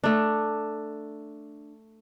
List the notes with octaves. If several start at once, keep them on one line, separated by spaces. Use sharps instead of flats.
A3 D4